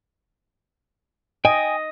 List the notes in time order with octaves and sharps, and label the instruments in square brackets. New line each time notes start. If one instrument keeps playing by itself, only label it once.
[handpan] D#5 [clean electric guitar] G5 G#5